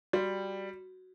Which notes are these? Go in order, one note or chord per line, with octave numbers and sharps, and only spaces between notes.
G3 F#4